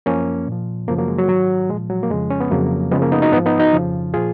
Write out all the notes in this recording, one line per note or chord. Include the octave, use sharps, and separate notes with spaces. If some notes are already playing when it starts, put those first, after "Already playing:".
F#2 F3 A#3 C#4
A#2 F3
F#2 C#3 F3 F#3 A#3
F#3 A#3
G#3
F#3
G#2 D#3 F#3
A#2 F3 G#3
F#3
A#3
F2 C#3 F3 G#3
C#4
B3
F2 C#3 F3 F#3 A#3
F#2 C#3 F3 G#3 B3
A#3 C#4
B3 D#4
D#4 F#4
G#2 F3 B3 D#4
B3 D#4
D#4 F#4
F2 C#3 F3
A#2 F3 F4 G#4